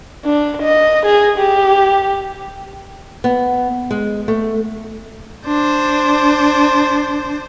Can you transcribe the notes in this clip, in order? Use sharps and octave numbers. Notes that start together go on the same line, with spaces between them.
D4
D#5
G#4
G4
B3
G#3
A3
D4 C5